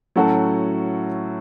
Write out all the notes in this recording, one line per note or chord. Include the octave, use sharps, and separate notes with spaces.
A2 F#3 C#4 F#4 A4